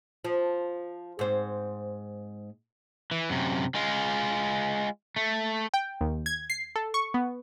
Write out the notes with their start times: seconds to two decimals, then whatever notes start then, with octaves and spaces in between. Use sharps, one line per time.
0.24 F3
1.19 G#2 C4
3.11 E3
3.30 F#2 C3
3.75 G#3 F4
5.16 A3
5.74 G5
6.01 D#2
6.26 G#6
6.50 C7
6.76 A4
6.94 C#6
7.14 B3